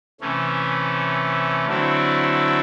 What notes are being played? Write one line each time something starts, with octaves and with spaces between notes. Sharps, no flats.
C3 E3 A3 C#4
D3 F#3 A3 C4 E4